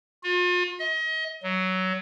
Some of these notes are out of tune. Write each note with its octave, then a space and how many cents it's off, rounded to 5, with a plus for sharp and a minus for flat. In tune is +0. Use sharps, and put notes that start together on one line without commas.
F4 +40
D#5 +35
F#3 +15